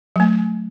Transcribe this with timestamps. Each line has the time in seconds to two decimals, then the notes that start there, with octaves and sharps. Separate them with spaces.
0.16 F#3 A3